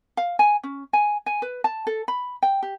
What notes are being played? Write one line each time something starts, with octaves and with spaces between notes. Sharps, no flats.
F5
G#5
C#4
G#5
G#5
B4
A5
A4
B5
G5
G4